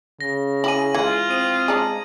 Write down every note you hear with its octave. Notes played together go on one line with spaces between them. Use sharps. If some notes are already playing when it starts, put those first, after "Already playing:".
C#3 A#6
E4 G4 G#4 D#7 F#7
E3 G#3 F4 G#6
C4 D#6 D#7
G#3 D4 D#4